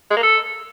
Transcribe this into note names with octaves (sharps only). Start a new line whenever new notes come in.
G#3
A#3
A4